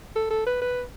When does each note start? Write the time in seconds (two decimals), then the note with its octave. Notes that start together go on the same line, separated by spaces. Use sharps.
0.16 A4
0.30 A4
0.47 B4
0.61 B4